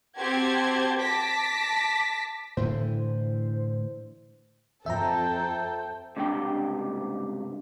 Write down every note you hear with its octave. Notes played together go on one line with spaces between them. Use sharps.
C4 F#4 G4 C5 A5 G#6
A5 D6 A#6 B6
A2 D3 E3 C5
F2 A4 C5 E5 G5 A#5
C#2 G2 C3 D4 G5